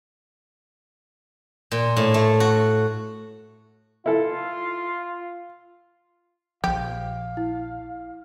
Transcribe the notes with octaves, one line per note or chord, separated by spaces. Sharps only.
A#2
A2
A3
F#4
E4 F4 A4
A#1 F3 G4 F5
E4